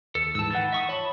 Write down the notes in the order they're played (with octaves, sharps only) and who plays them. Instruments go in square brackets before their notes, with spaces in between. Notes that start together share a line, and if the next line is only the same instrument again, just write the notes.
[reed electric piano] D#2 [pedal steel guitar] A4
[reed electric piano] G#2 E3 [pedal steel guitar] A5 E6
[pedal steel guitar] D#3 E3 [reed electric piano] F#5 A6
[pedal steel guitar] E5 C#6 D#6
[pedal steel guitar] F4 A5 B5 [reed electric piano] C#5